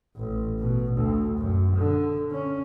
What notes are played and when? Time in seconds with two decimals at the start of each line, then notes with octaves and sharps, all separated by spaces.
0.16 A1
0.59 B2
0.93 D2
1.38 F#2
1.75 D3
2.31 C#4